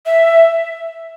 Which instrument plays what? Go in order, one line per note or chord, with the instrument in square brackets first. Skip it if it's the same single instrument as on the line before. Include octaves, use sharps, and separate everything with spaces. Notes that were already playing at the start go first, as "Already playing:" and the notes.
[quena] E5